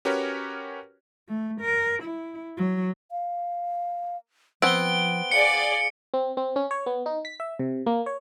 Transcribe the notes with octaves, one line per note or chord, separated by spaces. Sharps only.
C#4 F#4 G4 A#4 B4 C#5
A3
A#4
E4
F#3
F5
F3 B3 C4 D7 G7
G#4 D5 F5 C#7
C4
C4
C#4
C#5
B3
D#4
B6
E5
C3
A#3
C#5